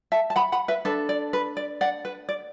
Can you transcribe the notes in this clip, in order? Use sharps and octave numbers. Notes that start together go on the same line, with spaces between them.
E5 A5
A5
F#5 B5
F#5 B5
B4 E5
D4 A4 B4
D5
B4
D5
D5 F#5
B4
D5